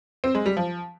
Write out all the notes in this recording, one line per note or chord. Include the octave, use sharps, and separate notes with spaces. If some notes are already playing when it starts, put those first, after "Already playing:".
C4
G#3
G3
F3